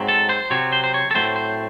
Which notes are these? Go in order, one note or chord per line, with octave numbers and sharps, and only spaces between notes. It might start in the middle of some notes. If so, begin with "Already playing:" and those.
Already playing: G#2 F#3 C4
A4
C5
C3 F#3 C4 C#5
C5
C5
C#5
A4
A2 F#3 A3 C4 C5
C5